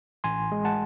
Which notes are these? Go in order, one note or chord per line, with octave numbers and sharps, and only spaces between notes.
A1 G#5 C6
G#3
F#5 A5